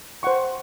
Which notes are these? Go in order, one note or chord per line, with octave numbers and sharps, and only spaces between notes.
C5 F#5 C#6